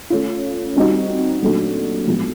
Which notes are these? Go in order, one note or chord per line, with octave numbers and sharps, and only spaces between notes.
A3 C#4 F4
G3 C4 D#4 F#4
A#2 F#3 A3 D4 F#4
A2 F3 G#3 B3